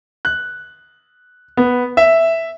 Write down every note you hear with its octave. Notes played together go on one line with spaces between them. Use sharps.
F#6
B3
E5